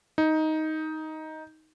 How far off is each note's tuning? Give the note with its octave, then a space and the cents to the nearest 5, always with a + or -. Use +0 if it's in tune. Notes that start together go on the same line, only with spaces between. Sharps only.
D#4 +10